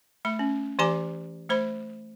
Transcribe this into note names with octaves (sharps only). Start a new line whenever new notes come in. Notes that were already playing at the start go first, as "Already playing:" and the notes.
A3 B5
C#4
E3 G4 D5 G#5 A#5 D6
A3 C5 B5